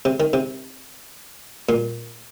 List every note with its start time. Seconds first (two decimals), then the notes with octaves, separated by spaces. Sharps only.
0.05 C3
0.20 D#3
0.33 C3
1.69 A#2